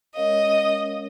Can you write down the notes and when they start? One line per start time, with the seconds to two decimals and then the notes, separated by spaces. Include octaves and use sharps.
0.16 G#3 C#4 A#4 C#5 D#5 F5